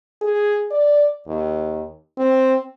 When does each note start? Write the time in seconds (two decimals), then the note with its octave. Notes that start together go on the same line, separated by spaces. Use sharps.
0.22 G#4
0.71 D5
1.27 D#2
2.17 C4